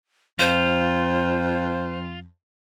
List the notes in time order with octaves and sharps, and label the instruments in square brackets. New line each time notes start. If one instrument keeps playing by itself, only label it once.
[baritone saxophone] F2 [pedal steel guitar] F4 [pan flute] C5